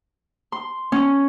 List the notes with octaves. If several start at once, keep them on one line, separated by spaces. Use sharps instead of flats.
C6
C#4